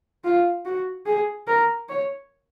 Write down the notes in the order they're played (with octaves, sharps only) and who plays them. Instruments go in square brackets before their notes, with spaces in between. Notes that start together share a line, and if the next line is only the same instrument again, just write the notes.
[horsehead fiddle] F4
F#4
G#4
A#4
C#5